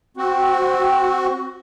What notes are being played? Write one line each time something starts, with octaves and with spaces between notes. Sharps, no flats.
C4 F#4